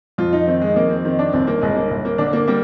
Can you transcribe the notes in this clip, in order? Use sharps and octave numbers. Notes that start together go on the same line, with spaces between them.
F2 F4
D#4
D#3 C4
G#3
F2 A#3
C4
D#3 C4
D4
G1 C4
A#3
G1 G#3
A#3
G1
A#3
D3 D4
A#3
G3 A#3